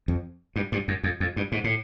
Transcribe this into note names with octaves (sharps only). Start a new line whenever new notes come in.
F2
G2
G2
F#2
F2
F2
G2
G#2
A2